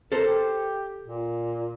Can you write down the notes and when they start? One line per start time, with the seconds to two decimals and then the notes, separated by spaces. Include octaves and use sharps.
0.12 A4 A#4 C5
0.25 G4
1.05 A#2